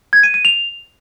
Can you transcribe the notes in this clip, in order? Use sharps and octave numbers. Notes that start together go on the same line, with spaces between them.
G#6
D#7
D#7
F7